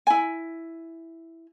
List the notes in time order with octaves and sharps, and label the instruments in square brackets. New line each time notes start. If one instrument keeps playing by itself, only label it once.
[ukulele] E4 G#5